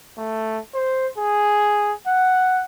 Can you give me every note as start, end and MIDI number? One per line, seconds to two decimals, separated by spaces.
0.18 0.58 57
0.74 1.08 72
1.18 1.93 68
2.07 2.65 78